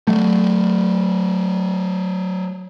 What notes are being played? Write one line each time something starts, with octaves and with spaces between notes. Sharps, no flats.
F#3 A3